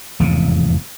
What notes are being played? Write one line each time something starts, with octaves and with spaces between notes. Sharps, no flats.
F1 E2 G#2 C#3